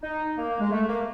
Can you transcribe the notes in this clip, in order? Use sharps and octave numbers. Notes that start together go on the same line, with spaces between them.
D#4
A#3
G#3
A3
A#3